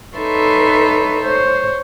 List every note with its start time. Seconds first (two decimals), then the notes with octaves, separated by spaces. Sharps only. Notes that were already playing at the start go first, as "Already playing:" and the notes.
0.17 D#4 A4 B4 C#5 E5 C6
1.24 C5 C#5